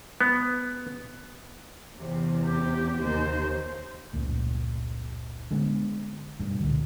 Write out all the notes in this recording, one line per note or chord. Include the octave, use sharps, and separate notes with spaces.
B3
E2 C3
G4
D#2 C5
F1 C#2 A#2
D3 G#3 B3 C4
G2 B2
C#2 A#2 D3